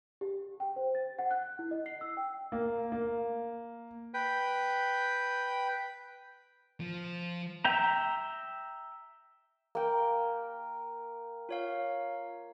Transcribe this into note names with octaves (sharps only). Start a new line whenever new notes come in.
G4
G5
C5
A6
F#5
F#6
E4
D#5
C7
E6
G5
A#3
A#3
B4 G5
F3
E5 G5 A#5
A#3 G5
F4 C#5 F5